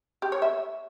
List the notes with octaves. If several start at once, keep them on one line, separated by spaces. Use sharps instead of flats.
G4
C#5
E5